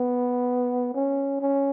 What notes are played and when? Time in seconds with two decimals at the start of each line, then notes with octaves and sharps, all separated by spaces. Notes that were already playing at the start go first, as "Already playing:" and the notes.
Already playing: B3
0.95 C#4
1.41 C#4